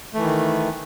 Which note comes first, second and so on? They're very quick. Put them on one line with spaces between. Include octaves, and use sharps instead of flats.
A3 E3 D#3